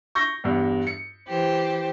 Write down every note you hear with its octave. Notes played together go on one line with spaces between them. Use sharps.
C#6 G6 A#6
E2 G2
C#7
E3 G4 C5